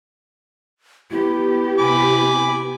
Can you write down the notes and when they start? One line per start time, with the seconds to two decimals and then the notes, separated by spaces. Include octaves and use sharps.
1.11 B3 E4 G4
1.79 C3 G#5 B5 D6